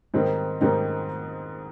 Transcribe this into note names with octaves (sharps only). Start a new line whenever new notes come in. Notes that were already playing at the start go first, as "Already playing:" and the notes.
G#2 D#3 G3 C4 D#4
G#2 D#3 G3 C4 D#4